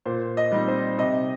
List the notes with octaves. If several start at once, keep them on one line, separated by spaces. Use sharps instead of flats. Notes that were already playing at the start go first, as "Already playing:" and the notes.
A#2 C5
D#5
G3 C4 D#4
C5
C3 D#5